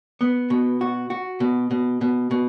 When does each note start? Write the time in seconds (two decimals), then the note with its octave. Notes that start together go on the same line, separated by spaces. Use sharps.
0.21 B3
0.50 B2
0.81 F#4
1.10 F#4
1.40 B2
1.71 B2
2.01 B2
2.31 B2